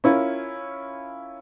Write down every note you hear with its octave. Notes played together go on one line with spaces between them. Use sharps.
C#4 E4 F4 A#4